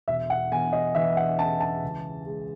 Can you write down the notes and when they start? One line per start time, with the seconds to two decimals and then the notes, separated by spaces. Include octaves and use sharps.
0.08 E1 E5
0.30 F#5
0.52 E2 G#5
0.73 D#5
0.95 E3 E5
1.17 F#5
1.39 C#3 A5
1.61 A5
1.82 C#2
2.26 G#3